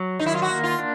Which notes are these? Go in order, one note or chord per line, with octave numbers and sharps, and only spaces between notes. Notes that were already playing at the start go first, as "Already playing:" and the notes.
Already playing: F#3
D#3 D#4
E4
F4
F#4
A#3
F4
D4